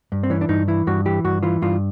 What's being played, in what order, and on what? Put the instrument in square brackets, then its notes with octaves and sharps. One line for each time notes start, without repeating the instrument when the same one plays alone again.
[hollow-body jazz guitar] G2
C4
E3 C#4
D4
G2 D#4
E3 E4
G2 F#4
E3 G4
G2 F#4
E3 F4
G2 F4